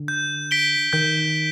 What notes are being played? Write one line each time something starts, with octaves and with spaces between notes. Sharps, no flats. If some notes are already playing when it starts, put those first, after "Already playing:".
Already playing: D3
G6
B6 D7 G7
D#3 G6
G7